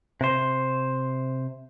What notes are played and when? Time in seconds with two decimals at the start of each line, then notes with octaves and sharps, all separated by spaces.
0.21 C3 C5